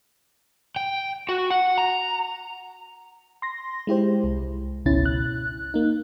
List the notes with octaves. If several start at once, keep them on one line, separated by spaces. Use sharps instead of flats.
G5
F#4
F#5
A#5
C6 A#6
G#3 E4 G4 C5
C2
G#1 C#2 B2 C#4 E4 A6
F#6
A#3 D#4